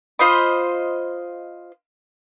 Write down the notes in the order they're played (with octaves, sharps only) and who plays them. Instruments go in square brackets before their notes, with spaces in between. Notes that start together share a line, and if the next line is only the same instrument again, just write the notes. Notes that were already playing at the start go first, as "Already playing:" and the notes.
[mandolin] F4 C5 D#5 B5